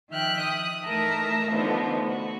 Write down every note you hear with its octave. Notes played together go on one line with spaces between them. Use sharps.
D#3 F3 E5 G5 F6 F#6
D#6
E3 A3 D#4 A#4 E5 A5
D3 E3 F3 A3 B3 D#4
F#4